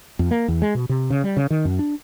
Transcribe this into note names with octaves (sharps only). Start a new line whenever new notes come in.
F2
A#3
E2
G#3
B2
C3
C#3
G3
C#3
D#3
F#2
D4